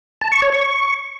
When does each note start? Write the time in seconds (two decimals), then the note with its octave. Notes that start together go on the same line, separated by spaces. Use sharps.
0.21 A5
0.32 C#6
0.42 C#5
0.52 C#6